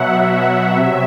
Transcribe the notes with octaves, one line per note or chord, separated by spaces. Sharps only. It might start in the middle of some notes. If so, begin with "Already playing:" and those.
Already playing: B2 F#3 E5 F#5
F#5
E5
C3 F#3